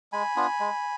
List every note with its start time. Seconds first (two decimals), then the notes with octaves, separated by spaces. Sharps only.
0.13 G#3 G#5 B5
0.36 B3 D4 F4
0.60 G#3